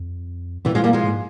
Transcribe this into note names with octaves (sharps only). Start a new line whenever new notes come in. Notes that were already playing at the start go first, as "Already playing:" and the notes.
Already playing: F2
A#2 E3 G3
F3 G#3
G3 A#3
F3 G#3
G#2